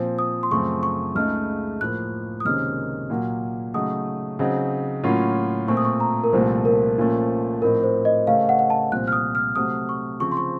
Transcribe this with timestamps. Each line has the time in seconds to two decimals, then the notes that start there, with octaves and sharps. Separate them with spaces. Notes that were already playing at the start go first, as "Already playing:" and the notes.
Already playing: A#2 F3 C4
0.19 D#6
0.43 C6
0.51 F#2 C#3 F3 A3 C4 C#6
0.83 C#6
1.15 C#2 C#3 A3 D#4 F6
1.81 A2 F3 A#3 F#6
2.40 D#6
2.45 C#2 C3 D#3 A#3 C#4 F6
3.10 A#2 F#3 A#3
3.74 C#3 F#3 A3 D#4 D#6
4.39 C#3 F#3 C4 D#4
5.04 A2 F#3 A#3 C#4 F4
5.68 A#2 A3 C4 C#6
5.77 D#6
5.85 C#6
6.00 A#5
6.24 A#4
6.33 C2 A#2 F3 A3 C4 C5
6.65 A#4
6.98 A#2 F3 A3 C#4
7.62 A2 F3 C4 D#4 A#4
7.84 C5
8.05 D#5
8.27 C#3 A3 C#4 F5
8.49 F#5
8.59 F#5
8.70 A5
8.91 C2 A#2 F3 C4 F#6
9.08 F6
9.12 D#6
9.35 F6
9.56 C3 F#3 A3 D#6
9.89 C#6
10.20 C#3 F3 C4 C#6
10.32 C6
10.37 C#6